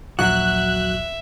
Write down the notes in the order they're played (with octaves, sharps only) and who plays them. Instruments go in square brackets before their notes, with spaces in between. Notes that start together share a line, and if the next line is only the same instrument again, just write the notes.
[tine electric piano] A#1 D#2 [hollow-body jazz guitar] F#3 F#4 [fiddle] E5 [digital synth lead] F#6